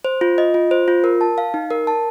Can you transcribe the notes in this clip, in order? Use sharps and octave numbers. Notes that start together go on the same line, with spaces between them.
C5
F4
D#5
F4
C5
F4
A#4
A5
F5
D#4
A#4
A5